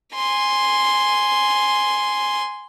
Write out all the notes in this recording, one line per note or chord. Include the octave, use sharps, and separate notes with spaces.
G#5 C6